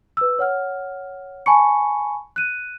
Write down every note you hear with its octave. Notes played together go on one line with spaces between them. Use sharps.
B4 E6
C#5 F#5 F6
G#5 A5 B5 C#6 C#7
F#6 D#7